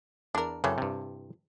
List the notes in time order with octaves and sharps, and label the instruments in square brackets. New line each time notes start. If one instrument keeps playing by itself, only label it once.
[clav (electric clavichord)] E2 [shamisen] D4 A#4
[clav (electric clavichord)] F#2 C#3 [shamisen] E3 C4 A4
[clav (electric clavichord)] G2 C3